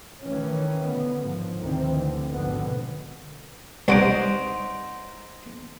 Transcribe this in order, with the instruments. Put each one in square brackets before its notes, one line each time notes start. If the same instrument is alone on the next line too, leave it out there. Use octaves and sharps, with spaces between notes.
[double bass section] D#3 E3 A3 C#4
D3 B3
G#2 D3 F3
D2 D#3 E3 C4
D3
G#1 B2 D3 F3 B3
[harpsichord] C2 C#5 D6 [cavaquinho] D#4 C5 F#5